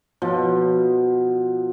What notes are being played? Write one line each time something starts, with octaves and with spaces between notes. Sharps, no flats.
B2 F3